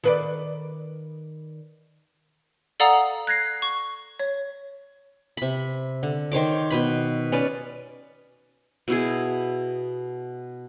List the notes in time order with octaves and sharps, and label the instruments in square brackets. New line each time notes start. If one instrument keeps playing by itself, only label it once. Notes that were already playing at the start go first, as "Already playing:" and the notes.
[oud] D#3 B4 D5
[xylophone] A4 D5 F5 F#5 A#5 D#6
F#6 G#6 A#6 C7
C#6
C#5
[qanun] C3 B5
D3
D#3 C5 C#5 D6
B2 B4 B5
C#4 B4 D5
B2 E4 G#4